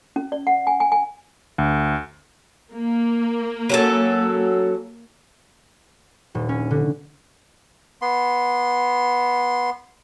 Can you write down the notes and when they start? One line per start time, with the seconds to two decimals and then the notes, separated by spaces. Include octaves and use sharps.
0.16 C#4
0.32 D5
0.47 F#5
0.67 G#5
0.80 G#5
0.92 G#5
1.58 D2
2.74 A#3
3.70 F#3 C#4 A4
6.35 D#1
6.49 C#4
6.71 D3
8.02 B3 C6